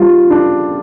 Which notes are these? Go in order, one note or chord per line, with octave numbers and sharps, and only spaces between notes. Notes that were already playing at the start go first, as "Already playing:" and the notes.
Already playing: G3 F4
D4